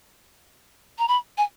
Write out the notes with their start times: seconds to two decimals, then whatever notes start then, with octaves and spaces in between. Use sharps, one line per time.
0.99 A#5
1.08 B5
1.38 G#5